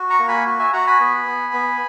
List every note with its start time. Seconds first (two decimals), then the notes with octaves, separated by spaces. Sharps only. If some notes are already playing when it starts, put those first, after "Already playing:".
Already playing: F#4
0.10 A#5 C#6
0.19 A#3
0.28 G#5 B5
0.46 F#4
0.59 E5 G#5
0.73 F#4 F#5 A#5
0.87 G#5 B5
1.00 B3
1.26 B3
1.53 B3